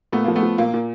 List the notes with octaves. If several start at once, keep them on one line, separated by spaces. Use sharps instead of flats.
A#2 A3 B3
F3 A#3
A3 B3
F3
A#2 A#3
A#2